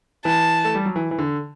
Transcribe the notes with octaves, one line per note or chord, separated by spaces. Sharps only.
E3 A5
A3
G3
F#3
E3
E3
D3